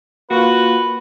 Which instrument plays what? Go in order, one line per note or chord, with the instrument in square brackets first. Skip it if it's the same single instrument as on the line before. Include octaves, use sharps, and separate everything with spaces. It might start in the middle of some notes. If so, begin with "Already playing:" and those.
[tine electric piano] A#3 F4 [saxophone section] F#4 [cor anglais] B4